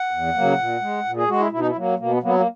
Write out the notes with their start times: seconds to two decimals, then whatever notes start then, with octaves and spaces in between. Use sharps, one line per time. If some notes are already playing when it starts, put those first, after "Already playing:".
Already playing: F#5
0.11 E2
0.35 C#3 F#3 A#3
0.58 A#2
0.81 G#3
1.05 A#2
1.17 G#4
1.28 G#3 F#4
1.40 E4
1.52 B2 E4
1.59 D#4
1.68 E4
1.76 F#3 A#3
1.99 B2 A#3
2.11 B3
2.22 F#3 A#3 B3
2.35 A#3